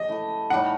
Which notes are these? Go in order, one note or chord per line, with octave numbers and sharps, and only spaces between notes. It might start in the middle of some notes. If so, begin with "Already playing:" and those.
Already playing: G4 D#5
A3 E4 A4
A2 G3 D#4 F#5